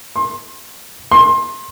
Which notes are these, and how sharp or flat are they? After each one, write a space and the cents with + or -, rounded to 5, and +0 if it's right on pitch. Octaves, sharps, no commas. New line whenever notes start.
C6 +30
C6 +25